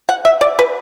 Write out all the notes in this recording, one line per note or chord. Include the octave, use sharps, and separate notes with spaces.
F#5
E5
D5
B4